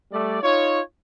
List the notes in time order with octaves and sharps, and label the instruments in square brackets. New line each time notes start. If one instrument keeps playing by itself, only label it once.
[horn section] G3 A3 D5
D#4 F4 C#5